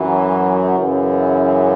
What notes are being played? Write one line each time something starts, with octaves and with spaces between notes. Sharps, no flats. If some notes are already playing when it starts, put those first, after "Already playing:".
Already playing: F#2 E3 F#3
F#2 C#3 E3